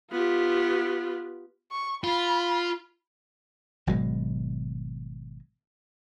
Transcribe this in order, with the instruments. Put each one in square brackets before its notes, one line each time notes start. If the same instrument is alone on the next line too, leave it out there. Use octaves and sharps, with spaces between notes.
[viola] B3 G4 [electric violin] F4
[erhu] C#6
[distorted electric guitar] F4 [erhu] B5
[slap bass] G#1 B2 F#3 G#3